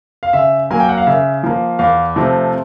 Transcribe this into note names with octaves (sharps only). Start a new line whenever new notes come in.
F5
C#3 E5
F#3 A#3 G#5
G5
F#5
F5
C#3 E5
F3 A#3
E2 F5
C3 F3 A3 C4